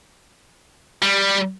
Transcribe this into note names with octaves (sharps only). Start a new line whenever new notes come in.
G3